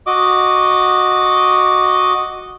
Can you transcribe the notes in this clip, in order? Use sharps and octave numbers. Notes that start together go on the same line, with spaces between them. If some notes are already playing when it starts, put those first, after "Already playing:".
F#4 D#5 D6